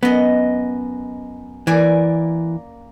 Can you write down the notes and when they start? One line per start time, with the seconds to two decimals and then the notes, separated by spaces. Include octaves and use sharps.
0.03 F#2 B3 D#5
1.67 E3 A#3 D5 G#5